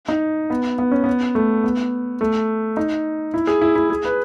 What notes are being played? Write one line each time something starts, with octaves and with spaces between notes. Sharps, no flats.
D#4
B3
B3
C#4
B3
A3
B3
A3
D#4
E4
G#4
E4
E4
G#4
B4